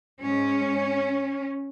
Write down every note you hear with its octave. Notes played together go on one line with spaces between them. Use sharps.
G#2 G#3 C#4